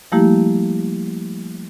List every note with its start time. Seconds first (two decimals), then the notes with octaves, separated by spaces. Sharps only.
0.12 F3 G3 A3 A#3 E4 G4